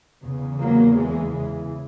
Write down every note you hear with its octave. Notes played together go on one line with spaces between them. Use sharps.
E2 C#3
F#3 A#3
E3 G#3
C#3 E3